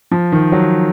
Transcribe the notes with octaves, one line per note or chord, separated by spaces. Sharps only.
F3
D#3
F#3